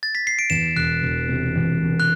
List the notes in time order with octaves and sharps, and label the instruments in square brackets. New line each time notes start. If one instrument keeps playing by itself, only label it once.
[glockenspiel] A6
B6
C7
D7
[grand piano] E2 [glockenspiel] E7
[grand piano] E1 [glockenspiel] F#6
[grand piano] E1
C3
E2
E1
[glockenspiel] F#6